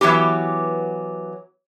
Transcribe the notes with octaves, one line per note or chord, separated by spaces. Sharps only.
E3 F#3 B3 G4